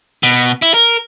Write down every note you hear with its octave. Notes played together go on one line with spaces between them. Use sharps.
B2
E4
A#4